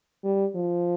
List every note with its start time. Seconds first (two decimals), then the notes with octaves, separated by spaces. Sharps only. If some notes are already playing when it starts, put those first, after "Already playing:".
0.24 G3
0.55 F3